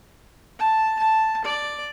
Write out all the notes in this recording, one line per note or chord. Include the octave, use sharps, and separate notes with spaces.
A5
A5
D5